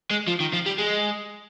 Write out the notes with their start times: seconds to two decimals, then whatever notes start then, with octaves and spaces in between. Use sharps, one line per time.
0.11 G#3
0.28 F3
0.40 D#3
0.53 F3
0.66 G3
0.78 G#3